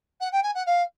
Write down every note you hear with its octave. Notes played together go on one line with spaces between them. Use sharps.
F#5
G5
G#5
F#5
F5